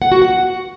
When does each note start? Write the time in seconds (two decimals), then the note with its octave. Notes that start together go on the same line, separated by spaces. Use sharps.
0.02 F#5
0.12 F#4
0.22 F#5